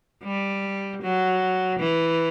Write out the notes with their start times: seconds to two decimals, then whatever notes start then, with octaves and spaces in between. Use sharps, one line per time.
0.23 G3
1.02 F#3
1.80 E3